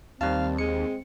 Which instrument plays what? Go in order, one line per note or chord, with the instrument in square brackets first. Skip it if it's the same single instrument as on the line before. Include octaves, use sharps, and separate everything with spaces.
[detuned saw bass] D#2 [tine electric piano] D#3 G3 A5 [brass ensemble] C4 [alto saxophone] F5
[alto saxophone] G#3 [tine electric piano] C#7